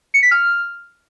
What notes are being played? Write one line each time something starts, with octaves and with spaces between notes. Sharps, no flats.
C#7
B6
F6